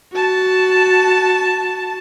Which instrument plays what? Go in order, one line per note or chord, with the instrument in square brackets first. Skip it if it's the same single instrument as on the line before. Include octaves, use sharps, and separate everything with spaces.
[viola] F#4 A5